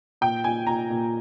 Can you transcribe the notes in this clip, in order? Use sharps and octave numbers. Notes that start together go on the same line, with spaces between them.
A#2 G5
A#2 G#5
A#2 A#5
A#2